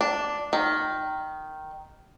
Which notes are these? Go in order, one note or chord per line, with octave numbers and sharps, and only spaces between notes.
D4
D#3